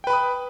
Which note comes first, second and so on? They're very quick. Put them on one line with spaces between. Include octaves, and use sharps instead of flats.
G5 B4 B5 D#6